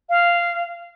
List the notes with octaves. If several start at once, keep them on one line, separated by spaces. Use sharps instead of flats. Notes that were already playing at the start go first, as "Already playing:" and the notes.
F5